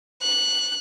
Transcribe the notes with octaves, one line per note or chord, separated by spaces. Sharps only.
F#6